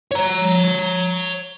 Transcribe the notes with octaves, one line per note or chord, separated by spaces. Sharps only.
C#5 A#5